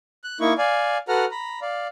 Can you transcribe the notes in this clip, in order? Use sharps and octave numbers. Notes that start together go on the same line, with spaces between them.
F#6
A#3 D#4 E4 C#6
D5 F5 G#5
F#4 A4 B4 F#5 A#5 F6
A#5 B5
D5 F5